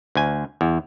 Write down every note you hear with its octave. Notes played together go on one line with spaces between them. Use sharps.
D2 G#5
E2